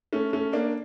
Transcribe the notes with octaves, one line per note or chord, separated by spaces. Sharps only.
A3 C#4
A3 C#4
A#3 D4